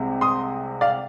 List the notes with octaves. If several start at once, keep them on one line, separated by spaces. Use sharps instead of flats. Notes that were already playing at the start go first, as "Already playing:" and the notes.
Already playing: C2 C3 G#3
C6 D#6
D5 F5